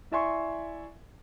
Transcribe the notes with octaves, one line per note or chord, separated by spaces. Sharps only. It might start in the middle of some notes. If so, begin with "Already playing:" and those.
E4 D5 E5 G#5 C6 C#6